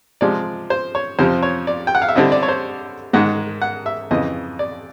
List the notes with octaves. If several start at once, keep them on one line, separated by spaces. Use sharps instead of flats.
C3 F3 G#3 D5
C5
C#5
F2 C3 F3 C5
C#5
D5
G5
F#5
F5
E5
D3 G3 C4 E4 D#5
D5
C#5
C5
G#2 D#3 G#3 F#5
F#5
E5
F2 C#3 E3 D#5
D5